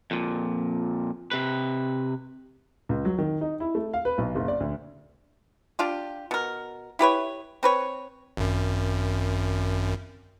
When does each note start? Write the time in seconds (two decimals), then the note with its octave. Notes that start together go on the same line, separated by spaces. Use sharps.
0.11 F2 A#2
1.31 C3 B4
2.89 C#2
3.05 F#3
3.18 D#3
3.41 D#4
3.60 E4
3.75 A3
3.94 F5
4.05 B4
4.18 B1
4.35 F#1
4.48 D5
4.60 D2
5.79 D4 F4 G4
6.31 B2 A#4
6.99 E4 G4 B4 C#5
7.63 C4 B4 C#5
8.37 G#1 F#2